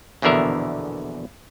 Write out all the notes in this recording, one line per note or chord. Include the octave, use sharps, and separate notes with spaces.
A#1 E2 B2 D3 A#4 E5